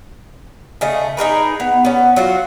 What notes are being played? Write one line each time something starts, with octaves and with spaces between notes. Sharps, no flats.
C#3 A3 D#5
D#4 G#4 A#4 B4
B3
B3 C#4
F#3 F4 F#4